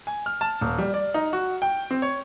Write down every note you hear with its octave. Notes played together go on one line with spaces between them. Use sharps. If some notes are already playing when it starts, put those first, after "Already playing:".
G#5
F6
A5
D#1
G3
D5
D#4
F#4
G5
C4
C#5